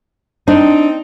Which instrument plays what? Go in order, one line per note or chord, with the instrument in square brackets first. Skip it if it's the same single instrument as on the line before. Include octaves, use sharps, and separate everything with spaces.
[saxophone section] C4 D#4 [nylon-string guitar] D4